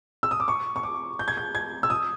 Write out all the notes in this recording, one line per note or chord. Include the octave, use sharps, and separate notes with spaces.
E6
D#6
D6
C#6
C#6
D6
G6
G#6
G6
G#6
E6
D#6